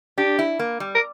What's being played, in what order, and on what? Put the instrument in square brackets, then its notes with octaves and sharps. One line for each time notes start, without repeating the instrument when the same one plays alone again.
[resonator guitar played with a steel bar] D4 [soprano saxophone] G4
[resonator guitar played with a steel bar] E4
A#3
G3
[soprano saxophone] A#4